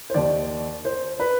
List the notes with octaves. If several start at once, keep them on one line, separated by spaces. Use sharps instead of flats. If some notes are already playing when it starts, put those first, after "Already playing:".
C5
D#2 D#3 D5
C5
B4